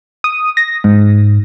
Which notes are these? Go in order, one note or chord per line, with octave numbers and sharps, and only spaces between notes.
D#6
A#6
G#2